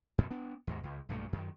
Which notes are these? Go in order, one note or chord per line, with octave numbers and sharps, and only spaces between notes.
F#2 B2 D3
B3 D4
D#2 G#2 B2
C#2
B1 G2 A#2 A3
F#2 D#3